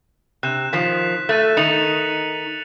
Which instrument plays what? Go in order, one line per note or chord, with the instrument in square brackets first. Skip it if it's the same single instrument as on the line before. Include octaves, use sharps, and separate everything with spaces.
[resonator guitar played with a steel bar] C3 [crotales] F#6 E7
[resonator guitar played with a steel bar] D#3 F3 [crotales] B6 E7
[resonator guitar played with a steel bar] A3 [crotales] F#6 A6 D#7
[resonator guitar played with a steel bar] D#3 D#4 [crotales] C#7 F7 F#7